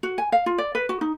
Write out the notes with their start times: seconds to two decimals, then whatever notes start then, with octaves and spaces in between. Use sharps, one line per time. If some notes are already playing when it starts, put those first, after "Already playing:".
0.03 F#4
0.18 G#5
0.32 F5
0.46 F4
0.58 D5
0.75 B4
0.89 F#4
1.01 D#4